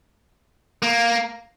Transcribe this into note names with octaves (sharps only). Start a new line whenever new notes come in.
A#3